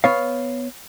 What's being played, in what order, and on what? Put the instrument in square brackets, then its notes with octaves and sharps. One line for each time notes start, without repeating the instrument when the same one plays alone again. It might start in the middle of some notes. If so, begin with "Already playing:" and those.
[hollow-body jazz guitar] B3 C#5 F5